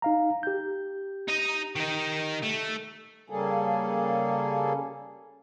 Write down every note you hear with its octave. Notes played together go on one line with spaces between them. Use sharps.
D#4 F5 A#5
G4 G6
D#4 D#5
D#3 D#4
A3
C#3 G3 A#3 G#4 A4